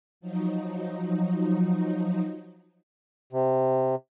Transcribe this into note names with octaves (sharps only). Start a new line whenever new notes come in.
F3 F#3 D#4
C3